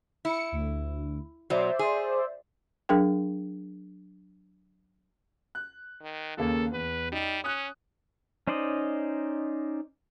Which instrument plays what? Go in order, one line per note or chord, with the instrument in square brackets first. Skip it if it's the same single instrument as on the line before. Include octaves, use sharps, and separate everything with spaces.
[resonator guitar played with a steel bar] E4 [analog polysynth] C#7
[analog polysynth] D2
[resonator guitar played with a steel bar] B2 F#3 [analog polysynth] C5 D5 E5
[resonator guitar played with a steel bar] G#4
[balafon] F#3 D4 G#4 A#4 G5
[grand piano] F#6
[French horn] D#3
[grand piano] D#2 C#3 A#3 [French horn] A4
[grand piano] E2 [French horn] B4
[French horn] G3 [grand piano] D#4
[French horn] C#4 [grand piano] D#6 F#6
[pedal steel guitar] C#4 D#4 C5 D5 D#5